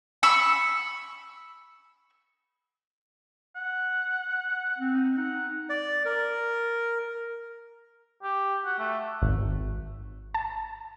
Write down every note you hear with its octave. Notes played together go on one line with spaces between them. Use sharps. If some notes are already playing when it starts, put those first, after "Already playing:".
B5 C#6 E6
F#5
C4
D#4
D#4 F#5
D5
A#4
G4
F#4
A3
G#1
A5